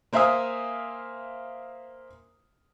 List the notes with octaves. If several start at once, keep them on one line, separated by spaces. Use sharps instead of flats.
A#3 C5 E5 F5 G#5 D#6